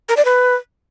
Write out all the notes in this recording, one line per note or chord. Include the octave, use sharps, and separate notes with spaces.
A#4
D5
B4